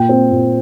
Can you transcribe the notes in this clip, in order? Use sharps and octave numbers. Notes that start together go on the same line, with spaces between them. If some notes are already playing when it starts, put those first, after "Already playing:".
Already playing: A#2 G5
C4
A#2